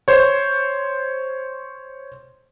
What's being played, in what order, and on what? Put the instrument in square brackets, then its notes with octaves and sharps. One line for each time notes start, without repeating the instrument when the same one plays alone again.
[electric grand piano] C5 C#5